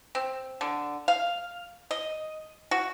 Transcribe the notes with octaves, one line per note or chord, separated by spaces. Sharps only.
C4
D3
F5
D#5
F#4